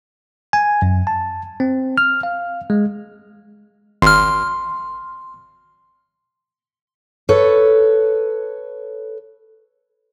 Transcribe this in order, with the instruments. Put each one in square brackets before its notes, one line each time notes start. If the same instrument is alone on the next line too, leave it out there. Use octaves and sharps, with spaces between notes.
[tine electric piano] G#5
F#2
A5
C4
F6
F5
G#3
[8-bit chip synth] G#1 F6 [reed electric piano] C6
[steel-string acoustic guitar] A4 B4 C#5